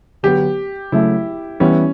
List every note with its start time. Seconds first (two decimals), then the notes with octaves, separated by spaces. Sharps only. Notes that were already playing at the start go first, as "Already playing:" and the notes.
0.23 D3 F#3 B3 G4
0.92 C#3 F#3 A3 E4
1.60 E3 G3 B3 C#4 E4 G4